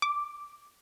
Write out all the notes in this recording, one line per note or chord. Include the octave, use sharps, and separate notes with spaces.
D6